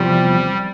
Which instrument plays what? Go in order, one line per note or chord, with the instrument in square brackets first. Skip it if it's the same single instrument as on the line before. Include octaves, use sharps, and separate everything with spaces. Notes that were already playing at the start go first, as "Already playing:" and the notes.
Already playing: [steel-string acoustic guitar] E2 C3 F3 [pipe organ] G3